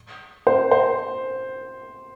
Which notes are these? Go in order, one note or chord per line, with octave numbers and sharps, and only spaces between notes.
C5
C5